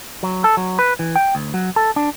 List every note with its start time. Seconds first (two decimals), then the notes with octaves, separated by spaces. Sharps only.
0.23 F#3
0.44 A4
0.57 F#3
0.79 B4
0.99 E3
1.16 G5
1.35 D2
1.54 F#3
1.76 A4
1.96 D4